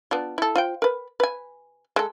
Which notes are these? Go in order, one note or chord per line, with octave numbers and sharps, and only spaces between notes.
B3 D4 F4
E4 A4
F4 C5 G5
A#4 B4
B4 G#5
G#3 A4